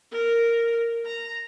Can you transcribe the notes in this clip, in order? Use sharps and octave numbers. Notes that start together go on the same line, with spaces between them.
A#4
A#5